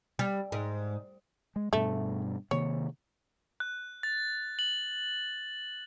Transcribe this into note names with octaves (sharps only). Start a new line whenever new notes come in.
G3
G#2
G#3
G2 B2 A3
C3 D#3 A#3 C#5
F#6
A6
F#7